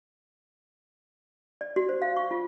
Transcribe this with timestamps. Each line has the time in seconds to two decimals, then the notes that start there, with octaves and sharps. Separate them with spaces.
1.61 D5
1.76 F#4
1.89 C5
2.02 F5
2.16 C#6
2.31 F4